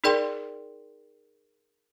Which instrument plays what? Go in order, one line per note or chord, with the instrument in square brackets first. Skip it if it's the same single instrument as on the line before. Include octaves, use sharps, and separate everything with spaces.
[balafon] D#4 G#4 A#4 D5 G5 C6